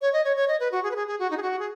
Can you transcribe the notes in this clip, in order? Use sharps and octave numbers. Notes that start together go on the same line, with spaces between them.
C#5
D#5
C#5
C#5
D#5
B4
F#4
G#4
B4
G#4
G#4
F#4
D#4
G#4
F#4
G#4